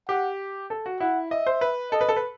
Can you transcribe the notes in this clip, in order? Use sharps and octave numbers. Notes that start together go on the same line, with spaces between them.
G4 F#5
A4
F#4
E4 F#5
D#5 E5
C5
B4
A4 D#5
B4
A4
B4